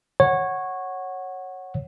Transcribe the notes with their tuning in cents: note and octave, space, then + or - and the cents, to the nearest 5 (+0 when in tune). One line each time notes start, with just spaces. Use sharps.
C#5 -15 F#5 +0